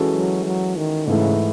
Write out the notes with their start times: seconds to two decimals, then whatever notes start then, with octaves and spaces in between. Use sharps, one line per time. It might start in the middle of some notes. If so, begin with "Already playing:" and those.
Already playing: E3 G#3 C#4 F#4 A4
0.14 F#3
0.45 F#3
0.76 D#3
1.07 G#2 C#3 E3 A3 E4